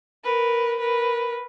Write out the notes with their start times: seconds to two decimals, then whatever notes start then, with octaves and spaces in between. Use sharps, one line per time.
0.24 A#4 B4
0.80 A#4 B4